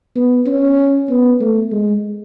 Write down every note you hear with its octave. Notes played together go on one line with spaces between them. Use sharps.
B3
C#4
B3
A3
G#3